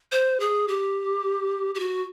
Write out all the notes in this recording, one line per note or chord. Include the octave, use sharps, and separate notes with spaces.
C5
G#4
G4
G4
F#4